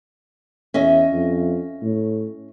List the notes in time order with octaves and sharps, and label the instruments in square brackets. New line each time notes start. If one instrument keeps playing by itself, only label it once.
[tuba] E2 [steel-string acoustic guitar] C#4 D#5 E5
[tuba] F2
A2